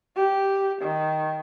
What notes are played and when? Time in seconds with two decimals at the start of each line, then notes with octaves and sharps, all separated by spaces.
0.16 G4
0.82 D#3